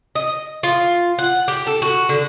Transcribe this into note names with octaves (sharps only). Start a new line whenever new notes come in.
D#5
F4
F#5
G4
A4
F#4
D3